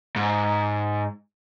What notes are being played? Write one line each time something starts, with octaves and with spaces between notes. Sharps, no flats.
G#2